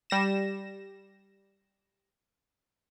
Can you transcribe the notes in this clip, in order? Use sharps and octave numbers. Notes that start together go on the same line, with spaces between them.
G3 A#6 E7